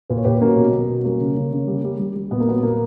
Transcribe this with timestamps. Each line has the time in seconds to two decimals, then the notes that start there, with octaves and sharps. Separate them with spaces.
0.09 A#2 B4
0.17 C#5
0.24 A#2 G4 B4
0.41 F#3 A#3 C#4
0.57 B2
0.73 B2 B3
0.88 F#3
1.04 G3 A#3 C#4
1.20 C#3
1.37 C#3
1.53 C#3
1.67 G3
1.84 G3
1.99 G3
2.16 G3
2.31 A#2 B3
2.40 A#3
2.47 F#3 B3
2.63 A#2 A#3